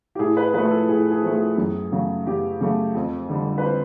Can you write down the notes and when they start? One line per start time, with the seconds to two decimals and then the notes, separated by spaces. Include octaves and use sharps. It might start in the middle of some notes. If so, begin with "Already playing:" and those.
0.15 G4
0.19 A2 G#4
0.37 B4
0.53 F3 A3 B4
0.71 A4
0.88 A2 G#4
1.11 G#4
1.23 F3 A3
1.35 G#4
1.57 F#2
1.92 C#3 F#3 A3
2.27 F#2 G4
2.60 C#3 F#3 A3
2.95 F2
3.29 D3 G3
3.58 B4
3.65 C5